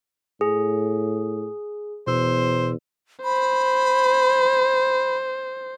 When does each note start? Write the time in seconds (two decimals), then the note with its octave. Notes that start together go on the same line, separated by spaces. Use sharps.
0.41 A2 G#4
2.07 E2 B2 C5 E6
3.24 C5 B5